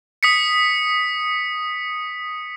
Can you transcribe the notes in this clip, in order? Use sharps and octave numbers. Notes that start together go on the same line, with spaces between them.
D#6 B6 C#7